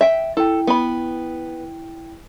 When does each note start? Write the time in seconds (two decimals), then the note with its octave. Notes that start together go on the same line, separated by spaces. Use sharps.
0.01 E5 G5
0.37 E4 A4 G5
0.67 B3 B5